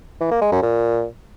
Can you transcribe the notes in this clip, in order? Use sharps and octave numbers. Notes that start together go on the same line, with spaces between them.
E3
A#3
G#3
F#2
A#2